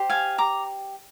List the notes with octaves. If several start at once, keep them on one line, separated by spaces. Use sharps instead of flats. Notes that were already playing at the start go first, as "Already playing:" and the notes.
Already playing: G4 C5
F5 G#5
A#5 D6